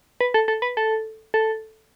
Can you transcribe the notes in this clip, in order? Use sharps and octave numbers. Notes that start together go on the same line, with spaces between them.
B4
A4
A4
B4
A4
A4